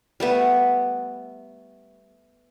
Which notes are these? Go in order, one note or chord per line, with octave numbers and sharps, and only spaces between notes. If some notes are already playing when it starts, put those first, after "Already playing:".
G3 A3 B3